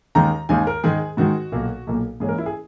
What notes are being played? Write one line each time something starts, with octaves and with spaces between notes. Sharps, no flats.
D#2 D#3 G#3 A#5
D#2 D#3 G#3 G#5
A#4
G#2 D#3 G#3 G#4
G#2 D#3 G#3 F#4
B1 A#2 A#3
B1 A#2 A#3
G#2 E3 A#3 C#4 G#4
A#4
E4
G#4